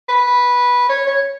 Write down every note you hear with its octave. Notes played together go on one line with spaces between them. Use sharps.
B4
C#5
C#5